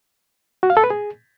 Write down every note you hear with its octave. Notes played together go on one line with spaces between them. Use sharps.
F#4
F5
A4
B4
G#4